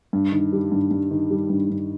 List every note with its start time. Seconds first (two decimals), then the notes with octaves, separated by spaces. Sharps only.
0.13 G2
0.32 D#3
0.53 G3
0.72 G2
0.91 G2
1.11 D#3
1.30 G3
1.50 G2
1.70 G2